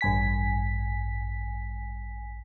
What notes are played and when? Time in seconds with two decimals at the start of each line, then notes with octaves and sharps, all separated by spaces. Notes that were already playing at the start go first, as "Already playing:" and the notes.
0.01 A1 G2 G#5 B6